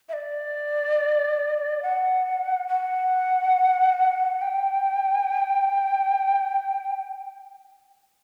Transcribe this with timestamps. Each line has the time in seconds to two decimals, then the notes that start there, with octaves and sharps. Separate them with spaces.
0.09 E5
0.13 D5
1.83 F#5
2.68 F#5
4.41 G5